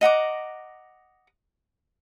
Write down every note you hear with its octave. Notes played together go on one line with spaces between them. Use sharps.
D#5 F#5 A#5 D6